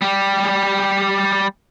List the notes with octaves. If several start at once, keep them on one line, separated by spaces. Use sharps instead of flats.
G3 G4